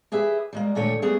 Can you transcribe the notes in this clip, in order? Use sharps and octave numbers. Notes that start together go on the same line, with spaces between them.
G4 G#4 B4 E5
G3 G#3 A#3
D#2 A#2 D3 A3 C#5 G5
G3 A3 B3 G#4